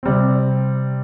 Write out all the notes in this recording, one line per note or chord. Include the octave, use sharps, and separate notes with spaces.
C3 G3 C4